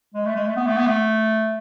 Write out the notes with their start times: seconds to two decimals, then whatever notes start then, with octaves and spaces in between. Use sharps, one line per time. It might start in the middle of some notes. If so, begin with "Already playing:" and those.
0.14 G#3
0.25 A3
0.36 G#3
0.45 A3
0.56 B3
0.67 A3
0.77 B3
0.86 A3